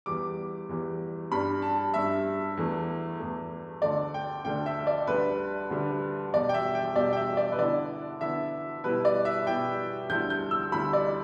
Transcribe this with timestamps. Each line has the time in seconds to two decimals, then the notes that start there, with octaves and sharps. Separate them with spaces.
0.06 E2 E3 G3 D6
0.69 E2 E3 G3
1.32 G2 G3 D4 B5
1.62 A5
1.94 G2 G3 D4 E5
2.57 E2 E3 A3
3.19 E2 E3 A3
3.82 D2 D3 A3 D4 D5
4.14 G5
4.45 D2 D3 A3 D4 G5
4.66 E5
4.87 D5
5.07 D2 D3 G3 D4 B4
5.70 D2 D3 G3 D4
6.33 E2 B2 G3 D5
6.49 G5
6.54 E5
6.75 G5
6.95 E2 B2 G3 D5
7.13 G5
7.17 E5
7.37 D5
7.52 B4
7.59 D3 B3 E4 D5
8.21 D3 B3 E4 E5
8.84 B2 G3 E4 B4
9.05 D5
9.25 E5
9.46 B2 G3 E4 G5
10.09 D2 D3 G3 E4 G6
10.30 G6
10.51 E6
10.72 D2 D3 G3 E4 B5
10.93 D5